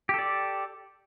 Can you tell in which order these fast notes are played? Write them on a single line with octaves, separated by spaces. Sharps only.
G4 A4 D5